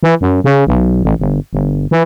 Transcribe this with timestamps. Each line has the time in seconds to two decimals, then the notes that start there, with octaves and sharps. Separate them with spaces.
0.03 E3
0.21 F#2
0.44 C#3
0.67 B1
1.03 A1
1.20 G1
1.53 G1
1.91 E3